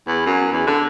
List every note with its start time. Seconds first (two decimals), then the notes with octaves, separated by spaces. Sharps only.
0.07 E2
0.26 F#2
0.52 E2
0.67 D3